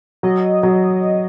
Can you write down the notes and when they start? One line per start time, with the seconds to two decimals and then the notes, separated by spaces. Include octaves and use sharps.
0.23 F#3 D#5
0.63 F#3